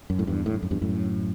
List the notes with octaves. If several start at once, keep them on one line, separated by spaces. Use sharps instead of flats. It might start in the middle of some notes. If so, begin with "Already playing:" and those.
F#2
A2
E2 G2
A2
G2
F#2
E2 G2
F#2 A2